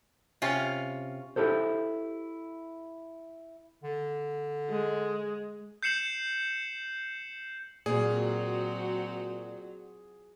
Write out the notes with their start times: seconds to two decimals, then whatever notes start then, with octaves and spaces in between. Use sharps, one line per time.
0.42 C3 C#4 F4
1.36 E4 G4 A4 C5
3.84 D3
4.69 G#3
5.83 G6 C7 C#7 E7 F#7
7.86 A#2 F#3 C4 F#4 G#4 D5